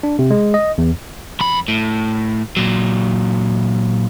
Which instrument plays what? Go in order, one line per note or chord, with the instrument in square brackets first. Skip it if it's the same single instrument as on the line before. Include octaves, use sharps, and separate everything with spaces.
[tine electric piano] D4
C3
G#3
D#5
E2
[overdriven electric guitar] F2 B5
A2
A#2 F#3